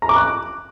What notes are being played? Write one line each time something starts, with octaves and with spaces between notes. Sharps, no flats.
A#5
D6
F#6